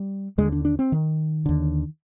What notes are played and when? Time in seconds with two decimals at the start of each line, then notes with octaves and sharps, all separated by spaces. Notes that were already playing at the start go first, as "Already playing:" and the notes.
Already playing: G3
0.38 D#2 D3 G#3
0.52 D4
0.65 D4
0.79 C4
0.92 D#3
1.46 D#2 D3